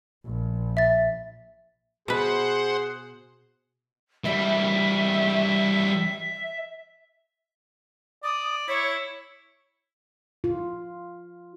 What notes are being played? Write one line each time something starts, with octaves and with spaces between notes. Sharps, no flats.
A#1
E5 A6
B2 G#4 B4 C5 F#5
E3 G3 E5
D5 D#6
E4 C#5
F4